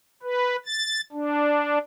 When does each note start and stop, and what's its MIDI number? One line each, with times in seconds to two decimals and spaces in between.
0.23 0.56 71
0.66 1.01 93
1.12 1.79 62